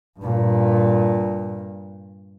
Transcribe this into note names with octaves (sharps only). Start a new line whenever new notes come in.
G2 A#2